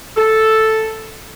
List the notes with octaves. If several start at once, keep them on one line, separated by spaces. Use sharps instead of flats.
A4